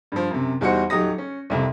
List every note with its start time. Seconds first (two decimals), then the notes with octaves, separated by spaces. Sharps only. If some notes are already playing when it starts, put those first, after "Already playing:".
0.12 G2 F3
0.31 F#2 C3
0.61 E2 G3 D#4 F#4 C5 C#7
0.90 D#1 F#3 D#4 G4 D#6 A#6
1.18 C#4
1.50 C2 F2 C3